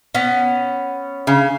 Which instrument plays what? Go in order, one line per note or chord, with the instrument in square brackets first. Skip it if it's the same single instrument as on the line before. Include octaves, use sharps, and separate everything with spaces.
[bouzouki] B3 C#4
[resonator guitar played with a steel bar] C#3